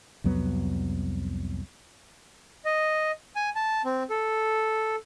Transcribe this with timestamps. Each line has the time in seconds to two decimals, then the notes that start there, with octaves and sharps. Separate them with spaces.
0.24 C2 F2 F#3 B3
2.65 D#5
3.36 G#5
3.55 A5
3.85 C4
4.10 A4